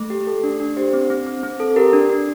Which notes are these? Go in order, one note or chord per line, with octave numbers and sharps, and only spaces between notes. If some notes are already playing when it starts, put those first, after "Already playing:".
Already playing: A3
G4
A4
D4
D4
G4 C5
C4
C4
C4
C4
A4
G4 A#4
D4
D4